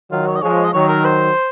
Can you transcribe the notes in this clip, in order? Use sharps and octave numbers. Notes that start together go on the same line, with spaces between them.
D#3 F#3 F4
C#5
D#5
F3 G#3 C#5
D#5
D#3 F#3 C#5
A#4
C5